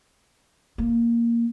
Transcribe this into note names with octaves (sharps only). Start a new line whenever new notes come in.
A#3